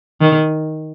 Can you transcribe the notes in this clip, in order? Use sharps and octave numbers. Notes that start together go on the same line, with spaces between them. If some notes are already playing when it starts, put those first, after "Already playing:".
D#3